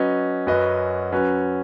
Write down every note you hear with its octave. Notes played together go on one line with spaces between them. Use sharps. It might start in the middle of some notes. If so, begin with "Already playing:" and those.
Already playing: F#3 C#4 B4 D#5
F#2 F#3 C#4 B4 D#5
F#3 C#4 B4